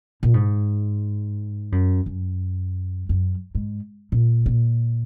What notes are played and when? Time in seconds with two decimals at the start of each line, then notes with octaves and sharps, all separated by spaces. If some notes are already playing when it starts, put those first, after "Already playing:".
0.23 A#2
0.34 G#2
1.72 F#2
2.06 F#2
3.09 F#2
3.55 G#2
4.12 A#2
4.46 A#2